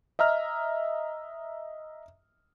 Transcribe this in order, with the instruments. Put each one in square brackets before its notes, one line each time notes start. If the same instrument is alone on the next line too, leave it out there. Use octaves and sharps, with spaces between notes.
[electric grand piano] D#5 E5 A#5 F6